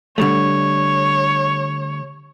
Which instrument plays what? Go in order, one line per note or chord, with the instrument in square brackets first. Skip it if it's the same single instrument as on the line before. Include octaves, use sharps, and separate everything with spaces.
[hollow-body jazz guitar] D3 G3 A3 [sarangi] C#5